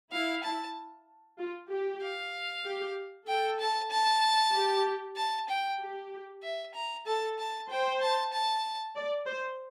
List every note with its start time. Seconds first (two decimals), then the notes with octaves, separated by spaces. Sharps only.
0.12 E4 F5
0.43 A5
1.39 F4
1.70 G4
2.02 F5
2.65 G4
3.28 A4 G5
3.60 A5
3.91 A5
4.54 G4
5.17 A5
5.49 G5
5.80 G4
6.43 E5
6.74 A#5
7.06 A4 A5
7.39 A5
7.70 C5 G5
8.01 A5
8.33 A5
8.96 D5
9.27 C5